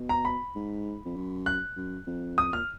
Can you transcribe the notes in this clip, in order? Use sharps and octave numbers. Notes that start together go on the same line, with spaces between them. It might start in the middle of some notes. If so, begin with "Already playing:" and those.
Already playing: B2
A#5
B5
G#2
F2
F#2
F#6
F#2
F2
D#6
A#2 F6